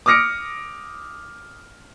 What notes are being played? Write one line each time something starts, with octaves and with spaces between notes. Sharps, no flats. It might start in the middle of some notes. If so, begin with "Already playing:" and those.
D6 D#6 F6 A#6 C#7 D7